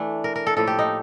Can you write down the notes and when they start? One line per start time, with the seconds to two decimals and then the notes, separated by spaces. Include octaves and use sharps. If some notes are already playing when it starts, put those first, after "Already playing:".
Already playing: E3 A3 D4
0.24 A#4
0.36 A#4
0.47 A4
0.57 A2 F3 A#3 A4
0.67 G4
0.79 D#4